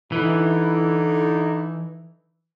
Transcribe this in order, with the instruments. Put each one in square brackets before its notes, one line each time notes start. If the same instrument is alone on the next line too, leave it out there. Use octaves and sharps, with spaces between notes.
[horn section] D3 D#4 E4 [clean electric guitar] E3